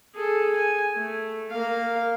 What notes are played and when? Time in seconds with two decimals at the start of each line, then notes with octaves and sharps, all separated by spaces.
0.15 G#4 A4
0.56 G#5
0.95 A3
1.51 A#3 F5